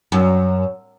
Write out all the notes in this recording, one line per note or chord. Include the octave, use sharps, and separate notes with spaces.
F#2